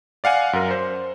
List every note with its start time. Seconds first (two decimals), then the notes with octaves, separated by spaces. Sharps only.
0.24 D5 F5 F#5 G#5
0.53 F#2 A#4
0.71 C5